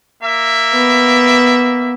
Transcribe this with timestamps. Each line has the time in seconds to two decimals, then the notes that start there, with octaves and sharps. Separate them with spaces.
0.23 A#3 E5
0.74 B3